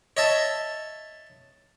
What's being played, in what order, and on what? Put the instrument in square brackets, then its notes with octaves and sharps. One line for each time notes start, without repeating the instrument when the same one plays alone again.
[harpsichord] C#5 D#5 E5 A5